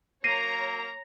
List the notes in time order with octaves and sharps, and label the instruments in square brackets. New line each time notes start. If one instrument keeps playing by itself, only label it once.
[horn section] F#3 A#3 [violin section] C#5 A#5 [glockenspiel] A#6 [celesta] C7 D#7